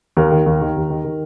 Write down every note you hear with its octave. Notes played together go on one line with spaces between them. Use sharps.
D#2 A#4
D#3
D#2
D#3
D#2
D#3
D#3